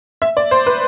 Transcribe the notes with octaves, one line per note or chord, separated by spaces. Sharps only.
E5
D5
C5
B4